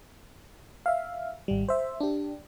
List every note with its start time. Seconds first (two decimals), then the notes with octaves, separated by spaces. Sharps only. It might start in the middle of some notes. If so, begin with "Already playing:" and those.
0.86 E5 F5
1.48 G#1 G3
1.69 C5 E5
2.00 D4 G4